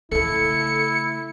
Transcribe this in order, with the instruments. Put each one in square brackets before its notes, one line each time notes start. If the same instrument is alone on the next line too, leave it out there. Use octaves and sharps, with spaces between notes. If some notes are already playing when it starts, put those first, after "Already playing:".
[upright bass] C#3 A3 [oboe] E4 [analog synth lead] A4 [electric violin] C#7